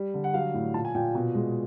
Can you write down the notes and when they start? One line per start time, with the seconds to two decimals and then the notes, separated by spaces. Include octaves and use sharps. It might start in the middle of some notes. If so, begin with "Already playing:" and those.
Already playing: G3
0.14 D3
0.24 F#5
0.34 F#3 F5
0.54 A2
0.74 A#2 A5
0.85 G#5
0.95 A#2 G5
1.15 B2
1.35 G#3